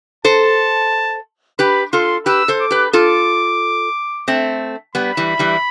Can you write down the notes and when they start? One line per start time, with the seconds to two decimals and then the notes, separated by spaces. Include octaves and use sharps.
0.24 A4 C5 A5
1.59 G4 B4 B5
1.93 F4 A4 C6
2.26 G4 B4 E6
2.48 A4 C5
2.60 D6
2.71 G4 B4
2.93 F4 A4 D6
4.28 A3 C4
4.95 G3 B3 B5
5.17 E3 G3
5.39 E3 G3